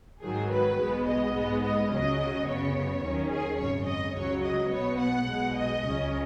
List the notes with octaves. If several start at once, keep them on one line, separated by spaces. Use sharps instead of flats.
G#1 G#2 D#3 F#3 G#4
B4
B1 B2 G#3 B3
D#5
G#2 G#3 B3
D#5
C#2 C#3 F#3 C#4 D#5
F#2 C#3 B3 C#5
D#2 D#3 F#3 C#4
G#4
G#1 F#2 C#3 C#5
D#5
C#2 C#3 F#3 C#5
D#5
B1 B2 B3 C#5
F#5
B1 B2 G#3
D#5
C#2 C#3 F#3 C#4